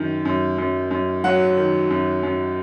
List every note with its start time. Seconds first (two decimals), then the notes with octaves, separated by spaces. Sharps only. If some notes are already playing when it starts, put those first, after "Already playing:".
Already playing: F#2 D#3
0.25 F#2
0.58 F#2
0.91 F#2
1.24 F#3 F#5
1.57 D#3
1.90 F#2
2.23 F#2